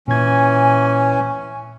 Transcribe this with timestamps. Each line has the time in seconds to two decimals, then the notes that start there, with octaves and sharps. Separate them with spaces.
0.08 A#2 E3 C#4 G#5 G#6